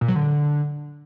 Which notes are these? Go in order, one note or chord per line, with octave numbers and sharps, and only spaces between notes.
A#2
F#3
D3